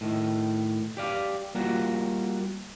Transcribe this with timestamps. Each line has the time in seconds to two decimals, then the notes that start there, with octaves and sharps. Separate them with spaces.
0.01 A2 D#3
0.97 G4 D5 F5
1.55 G3 A#3 F4 F#4